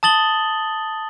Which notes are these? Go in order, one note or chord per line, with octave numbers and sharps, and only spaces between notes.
A5 D#6 A6 F#7 G7